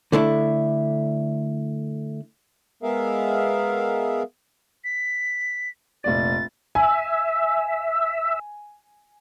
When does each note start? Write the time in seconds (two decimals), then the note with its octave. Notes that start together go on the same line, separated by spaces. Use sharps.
0.12 D3 A3 D4 E4
2.83 G#3 B3 G#4 A#4 E5 F5
4.84 B6
6.04 F1 A#1 D5 A6
6.75 E5 G#5